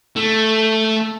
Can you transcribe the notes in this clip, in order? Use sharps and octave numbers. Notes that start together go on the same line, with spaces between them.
A3